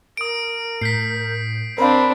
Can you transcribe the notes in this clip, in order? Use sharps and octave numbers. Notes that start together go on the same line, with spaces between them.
A#4 D#6 D7
A2 G6 B6 C7
C4 D4 A#4 F5 B5